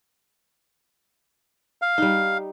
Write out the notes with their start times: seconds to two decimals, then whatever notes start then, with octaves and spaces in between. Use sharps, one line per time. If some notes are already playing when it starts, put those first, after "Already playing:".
1.82 F5
1.98 G3 D#4